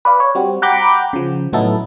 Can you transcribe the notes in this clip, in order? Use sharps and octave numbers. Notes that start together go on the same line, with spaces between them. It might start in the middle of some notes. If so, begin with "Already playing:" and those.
B4 D5 F5
C#5
G3 C4 F#4
F#5 G5 A#5 B5 D6 G6
C#3 F3
A2 F#3 B3 D#4 E4 A4